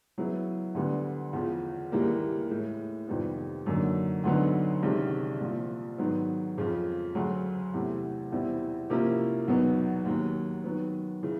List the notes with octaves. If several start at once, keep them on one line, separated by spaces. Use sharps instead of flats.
C#3 F#3 B3 E4
D2 D3 G3 B3
E2 C#3 F3
D#2 C#3 E3 G3 A#3
A2 E3 G#3
F2 C3 D#3 G3 B3
F#2 D3 F#3 A#3 D#4
D2 D3 F#3 B3 D#4
C2 C3 D#3 G#3 C#4
C2 A#2 F3
G#2 D#3 F#3 B3
F2 C#3 F3
D2 C#3 F#3
E2 C3 E3 A3
E2 B2 G3 C4 E4
C3 F3 A#3 C#4 E4
E2 B2 F#3 B3 D#4
D#2 D#3 F#3
D#3 F#3 B3
C#3 E3